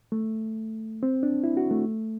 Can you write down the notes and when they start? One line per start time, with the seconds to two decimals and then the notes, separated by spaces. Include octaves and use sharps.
0.12 A3
1.03 C4
1.23 D4
1.44 E4
1.57 F#4
1.71 A3